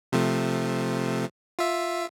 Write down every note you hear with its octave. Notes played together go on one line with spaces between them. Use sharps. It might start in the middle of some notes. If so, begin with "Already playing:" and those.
C3 F3 A3
F4 E5